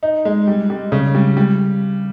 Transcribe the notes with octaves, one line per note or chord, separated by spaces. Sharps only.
D#4
G#3
G3
G3
C#3
G3
G3